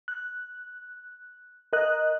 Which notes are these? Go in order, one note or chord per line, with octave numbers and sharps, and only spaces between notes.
F#6
A#4 D#5 F#6